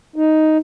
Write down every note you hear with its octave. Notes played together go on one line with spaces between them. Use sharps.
D#4